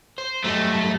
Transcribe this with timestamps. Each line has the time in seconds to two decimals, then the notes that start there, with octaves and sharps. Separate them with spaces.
0.18 C5
0.44 F#2 G3 A3 D#5